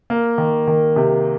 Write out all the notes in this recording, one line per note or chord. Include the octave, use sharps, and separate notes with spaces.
A#3
D#3
D#3
C3